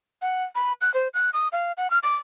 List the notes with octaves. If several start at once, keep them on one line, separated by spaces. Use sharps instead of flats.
F#5
B5
F#6
C5
F#6
D#6
F5
F#5
F6
D6